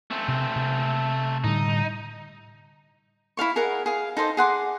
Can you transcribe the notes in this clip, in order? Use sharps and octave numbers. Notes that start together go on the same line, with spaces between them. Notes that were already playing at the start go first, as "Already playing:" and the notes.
A3 C4
C3
C3
A2 D3 G3 D#4
E4 A4 F5 C#6
G#4 A#4 D#5 F#5
G#4 F5
D#4 A4 C5 D#5
G#4 F#5 C6 D6